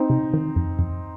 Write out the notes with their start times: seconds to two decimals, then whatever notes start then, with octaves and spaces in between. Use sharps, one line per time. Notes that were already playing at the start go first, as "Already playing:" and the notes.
Already playing: C4 D#4
0.10 C3
0.34 D#3
0.56 F2
0.79 F2